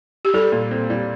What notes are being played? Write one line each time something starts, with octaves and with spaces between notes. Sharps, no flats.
G4
G3 A4
A#2
C4
G3